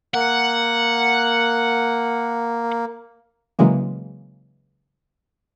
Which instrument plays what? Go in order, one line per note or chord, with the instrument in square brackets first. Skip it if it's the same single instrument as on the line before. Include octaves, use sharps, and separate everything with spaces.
[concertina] A#3 [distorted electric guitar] F#5
[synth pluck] C#3 E3 F#3 G#3 A#3